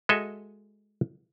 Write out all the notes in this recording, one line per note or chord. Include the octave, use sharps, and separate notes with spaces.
G#3 F#4 A4 D#5 E5